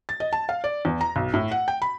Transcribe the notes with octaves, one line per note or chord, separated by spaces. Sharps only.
A6
D#5
A5
F5
D5
E2
A#5
B1
A2
F#5
G5
B5